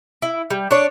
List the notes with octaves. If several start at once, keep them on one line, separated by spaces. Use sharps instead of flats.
E4
G3
D4 C#5